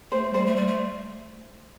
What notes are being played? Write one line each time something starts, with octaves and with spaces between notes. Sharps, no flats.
A3 C5
G3 C5
A3
G3
A3